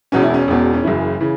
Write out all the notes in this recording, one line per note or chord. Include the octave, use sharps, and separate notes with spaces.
E1 E2 B2 C#4
E4
C#4
E1 E2 B2
C#4
F#1 F#2 C#3 E3 E4
C#3 E3